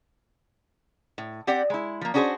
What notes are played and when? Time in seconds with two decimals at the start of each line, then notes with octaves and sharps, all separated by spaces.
1.18 A2
1.47 C4 G4 D5 F#5
1.70 G#3 E4
2.01 F3 A#3
2.14 C#4 D4 F#4 G#4 A#4 C5